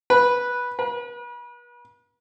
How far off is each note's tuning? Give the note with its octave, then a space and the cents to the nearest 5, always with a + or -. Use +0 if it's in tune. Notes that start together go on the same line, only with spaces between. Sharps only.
B4 -10
B4 -40